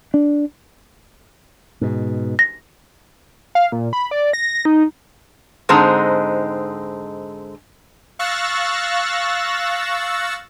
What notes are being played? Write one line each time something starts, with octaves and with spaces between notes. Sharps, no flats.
D4
G#2 B2
A#6
F5
A#2
B5
D5
A#6
D#4
G#2 D3 G#3 C4 D#4 A5
F5 C#6 E6 F#6 A6 A#6